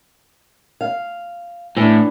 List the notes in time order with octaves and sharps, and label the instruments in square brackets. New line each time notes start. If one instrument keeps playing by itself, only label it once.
[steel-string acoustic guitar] F5
[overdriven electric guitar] A2 [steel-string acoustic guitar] E3 D4